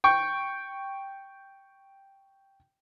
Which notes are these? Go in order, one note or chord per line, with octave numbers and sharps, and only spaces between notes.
G5 C#6